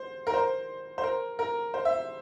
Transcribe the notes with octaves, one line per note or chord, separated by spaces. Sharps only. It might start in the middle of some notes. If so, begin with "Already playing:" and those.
Already playing: C5
A#4
C5
C5
A#4
A#4
C5
E5